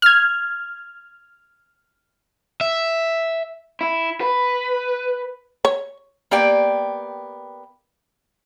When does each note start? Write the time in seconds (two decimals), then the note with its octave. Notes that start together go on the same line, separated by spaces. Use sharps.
0.02 F6 G#6
2.61 E5
3.81 E4
4.21 B4
5.65 C#5
6.31 A#3 B3 G4 D5 G5